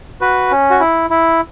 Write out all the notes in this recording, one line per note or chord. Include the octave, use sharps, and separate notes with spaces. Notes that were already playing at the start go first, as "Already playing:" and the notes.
F#4 B4
C#4
F#4
E4
E4